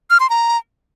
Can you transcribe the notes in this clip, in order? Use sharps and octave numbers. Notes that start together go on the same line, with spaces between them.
F6
C6
A#5